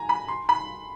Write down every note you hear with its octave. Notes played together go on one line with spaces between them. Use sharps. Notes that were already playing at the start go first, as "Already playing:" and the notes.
Already playing: G#5 A#5
B5
C6
B5